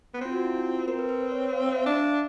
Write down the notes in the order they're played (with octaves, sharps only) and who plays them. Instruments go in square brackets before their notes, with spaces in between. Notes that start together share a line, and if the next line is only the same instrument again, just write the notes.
[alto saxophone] B3
[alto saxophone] C4 [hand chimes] F4
[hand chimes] F#4
E4
F4
[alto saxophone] C4 [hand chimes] A#4
[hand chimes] B4
B4
C5
C#5
F5
F5
E5
[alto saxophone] D4 [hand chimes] E5